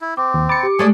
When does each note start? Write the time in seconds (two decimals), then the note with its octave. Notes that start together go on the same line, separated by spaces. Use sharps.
0.01 E4
0.17 C4 D6
0.34 D#2
0.49 B5 D6 A6 C#7
0.63 G4
0.79 G#3 A3 D5 G#5 A5 D#6